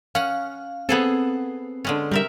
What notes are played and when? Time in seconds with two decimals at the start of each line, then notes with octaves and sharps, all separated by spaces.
0.15 C#4 F5 F#5
0.89 B3 C4 G#4 A4
1.85 D3 G#3 C#4
2.11 C3 G3 A#4 E5